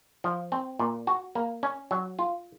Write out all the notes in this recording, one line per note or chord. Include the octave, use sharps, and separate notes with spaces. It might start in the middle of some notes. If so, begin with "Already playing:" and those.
F3
C4
A#2
F#4
A#3
C#4
F#3
F4